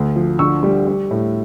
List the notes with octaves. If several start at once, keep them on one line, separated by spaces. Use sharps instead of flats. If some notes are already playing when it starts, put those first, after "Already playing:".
Already playing: D2
F3
D3 C#6 E6
G3
G3
A2